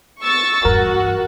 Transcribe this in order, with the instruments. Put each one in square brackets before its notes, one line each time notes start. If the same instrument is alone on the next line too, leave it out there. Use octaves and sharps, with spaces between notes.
[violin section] C#6 E6 A6
[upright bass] E2 G2 [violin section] F#4 [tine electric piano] A#4